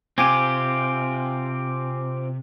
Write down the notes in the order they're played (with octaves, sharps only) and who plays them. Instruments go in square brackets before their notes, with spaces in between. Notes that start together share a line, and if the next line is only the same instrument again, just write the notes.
[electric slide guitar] C3 [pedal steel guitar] C4 F4 G4 [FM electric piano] G#5 D6